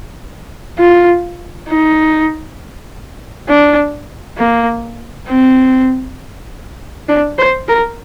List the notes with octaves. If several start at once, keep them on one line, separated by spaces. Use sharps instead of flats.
F4
D#4
D4
A#3
C4
D4
C5
A#4